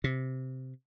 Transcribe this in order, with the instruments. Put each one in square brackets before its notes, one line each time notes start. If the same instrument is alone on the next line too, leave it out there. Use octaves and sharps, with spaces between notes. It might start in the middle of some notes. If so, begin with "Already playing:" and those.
[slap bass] C3